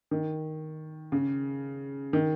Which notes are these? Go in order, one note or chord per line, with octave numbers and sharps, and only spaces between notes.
D#3
C#3
D#3